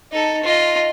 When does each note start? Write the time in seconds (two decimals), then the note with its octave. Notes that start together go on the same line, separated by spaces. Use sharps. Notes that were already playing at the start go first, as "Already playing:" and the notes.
0.11 D#4 A4
0.43 F4 D#5